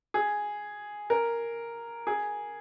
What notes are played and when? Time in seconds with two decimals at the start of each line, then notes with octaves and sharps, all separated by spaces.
0.14 G#4
1.10 A#4
2.07 G#4